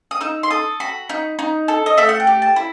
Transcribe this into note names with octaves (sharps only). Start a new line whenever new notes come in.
D#6
D#4 E6
C6
A4 D#6
F#4 B5
D#4
D#4
A4
D#5
A3 E5
F#5
G5
G4
A5
E4